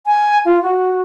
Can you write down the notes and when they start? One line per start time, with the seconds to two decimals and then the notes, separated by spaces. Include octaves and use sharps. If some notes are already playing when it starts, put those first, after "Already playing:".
0.06 G#5
0.46 F4
0.62 F#4